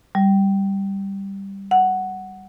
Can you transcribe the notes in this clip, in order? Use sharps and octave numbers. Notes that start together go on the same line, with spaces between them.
G3
F#5